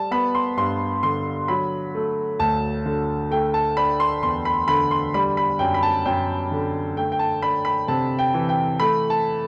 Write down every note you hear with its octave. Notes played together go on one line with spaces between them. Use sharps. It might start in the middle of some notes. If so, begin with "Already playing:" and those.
Already playing: G3 A5
B3 B5
C6
G2 C6
D3 C6
F#3 B5
A3
D2 A5
D3
A3 G5
A5
D4 B5
C6
E2 C6
B5
D3 B5
C6
G3 B5
B5
F#2 G5
B5
A5
F#2 G5
D3
A3 G5
G5
A5
D4 B5
B5
C3 A5
G5
E3
G5
A3 B5
A5